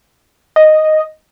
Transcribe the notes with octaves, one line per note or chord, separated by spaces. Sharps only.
D#5